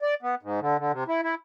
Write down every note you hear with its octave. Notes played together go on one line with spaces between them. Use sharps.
D5
B3
G#2
D3
D3
C3
E4
E4